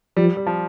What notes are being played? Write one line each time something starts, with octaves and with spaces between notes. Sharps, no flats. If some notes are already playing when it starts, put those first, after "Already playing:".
F3 G3
G3
F3